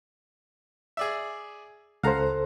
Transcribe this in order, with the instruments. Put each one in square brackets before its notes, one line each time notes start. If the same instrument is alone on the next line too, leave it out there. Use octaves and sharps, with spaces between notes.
[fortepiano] G#4 D5 E5
[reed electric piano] C#2 A4 C5 [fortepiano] F5 F#5 A#5